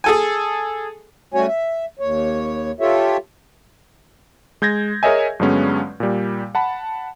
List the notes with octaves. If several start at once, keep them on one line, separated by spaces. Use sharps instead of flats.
G#4 A4 G#5
G3 A3 C#4 F#4 C#5 G#5
E5
D#2 C#5
F4 G4 A4 C#5 E5
G#3 G6 G#6 A#6
G#4 A#4 C#5 D#5 E5 G#5
G2 D3 F#3 G#3 B3 C#4
A#2 G3
F#5 A5 B5